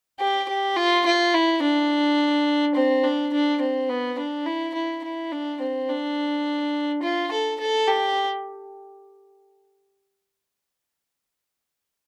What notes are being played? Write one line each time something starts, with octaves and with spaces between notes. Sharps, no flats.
G4
G4
F4
F4
E4
D4
C4
D4
D4
C4
B3
D4
E4
E4
E4
D4
C4
D4
F4
A4
A4
G4